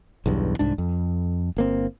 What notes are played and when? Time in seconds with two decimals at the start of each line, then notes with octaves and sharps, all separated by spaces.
0.26 B1 E2 G2
0.59 C2 G#2 D4
0.78 F2
1.57 G1 A#3 C4